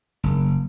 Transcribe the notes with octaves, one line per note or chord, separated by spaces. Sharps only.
F#1